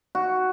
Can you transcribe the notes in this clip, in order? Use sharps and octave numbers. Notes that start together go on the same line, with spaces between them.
F#4